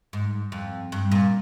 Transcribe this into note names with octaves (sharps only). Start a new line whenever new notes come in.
G#2
F2
G2
A#2